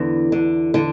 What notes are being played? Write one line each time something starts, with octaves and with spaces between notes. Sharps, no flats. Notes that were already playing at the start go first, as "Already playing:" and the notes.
Already playing: E2 D3
D3
D3